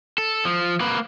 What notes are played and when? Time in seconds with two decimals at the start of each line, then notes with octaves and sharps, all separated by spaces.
0.18 A4
0.45 F3
0.80 A#3 B4